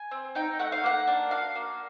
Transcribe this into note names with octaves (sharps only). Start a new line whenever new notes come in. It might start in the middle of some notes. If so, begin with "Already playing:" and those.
Already playing: G#5
C4
D#4 G5
A3 F#5
F5
A#3 F#5
D4
F#4 F5
A#3